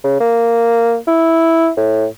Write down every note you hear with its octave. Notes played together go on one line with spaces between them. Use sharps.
C#3
A#3
E4
A2